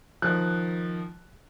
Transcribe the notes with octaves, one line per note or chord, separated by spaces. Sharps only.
D#3 F3 F#6